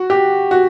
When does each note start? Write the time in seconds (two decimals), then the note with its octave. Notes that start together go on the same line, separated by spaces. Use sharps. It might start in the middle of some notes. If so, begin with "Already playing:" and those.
Already playing: F#4
0.10 G4
0.51 F#4